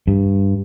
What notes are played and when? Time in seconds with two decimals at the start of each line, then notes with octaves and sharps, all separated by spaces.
0.08 G2